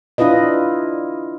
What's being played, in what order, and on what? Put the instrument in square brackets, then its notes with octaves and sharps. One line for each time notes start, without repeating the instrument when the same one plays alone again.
[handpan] D4 E4 F4 B4 D#5